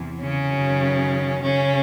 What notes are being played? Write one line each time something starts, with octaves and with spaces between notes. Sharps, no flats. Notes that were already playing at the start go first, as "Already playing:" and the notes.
Already playing: E2 C3 E3
C#3 C#4
F#2 D#3 F#3
C#3 C#4